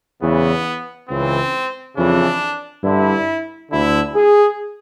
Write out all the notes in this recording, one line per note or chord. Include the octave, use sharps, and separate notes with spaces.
E2 C#3 E3 B3
C#2 C#3 E3 C4
F2 C#3 E3 D4
G2 D3 E4
D2 D3 E4
G#4